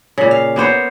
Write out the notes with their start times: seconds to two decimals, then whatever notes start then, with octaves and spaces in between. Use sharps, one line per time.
0.18 A#2 C#3
0.31 F5
0.56 A#3 B3 C5 C#5